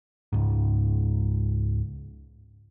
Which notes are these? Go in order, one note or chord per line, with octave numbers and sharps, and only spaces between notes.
C#2 G#2